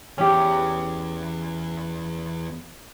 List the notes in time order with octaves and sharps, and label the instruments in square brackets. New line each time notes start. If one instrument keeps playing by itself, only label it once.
[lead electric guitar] E2 [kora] C#4 G4